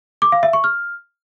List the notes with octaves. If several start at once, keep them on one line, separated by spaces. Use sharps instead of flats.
D6
F5
E5
C#6
F6